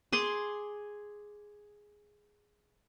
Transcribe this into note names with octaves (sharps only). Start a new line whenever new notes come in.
G#4 C6 D6